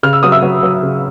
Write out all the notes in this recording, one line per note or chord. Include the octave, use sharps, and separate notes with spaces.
C#3 F6
E6
F#3 D#6
E5 E6
F#3
F#3
C#3